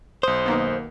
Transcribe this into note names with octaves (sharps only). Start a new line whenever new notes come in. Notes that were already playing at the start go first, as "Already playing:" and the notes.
B1 C5 D#6
D#3 A#3 B3